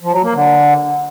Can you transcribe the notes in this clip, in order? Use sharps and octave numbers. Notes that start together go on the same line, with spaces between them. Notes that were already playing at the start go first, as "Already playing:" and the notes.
F3
F#3
A#3
D3